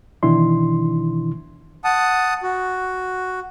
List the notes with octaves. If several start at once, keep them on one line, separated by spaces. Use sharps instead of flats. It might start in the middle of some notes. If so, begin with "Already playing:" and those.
B2 D#3 E3 D4 E4 C6
F#5 A5 D#6
F#4